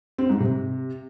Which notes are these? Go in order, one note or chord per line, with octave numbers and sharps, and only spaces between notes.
C4
G#2
C3